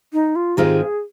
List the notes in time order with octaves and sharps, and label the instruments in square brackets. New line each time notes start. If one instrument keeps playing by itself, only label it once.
[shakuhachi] D#4
F4
[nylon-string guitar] G#2 D#3 G#3 C4 F4 [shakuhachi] G4
[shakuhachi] G#4